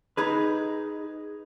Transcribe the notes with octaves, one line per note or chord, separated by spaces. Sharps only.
D#4 G#4 B4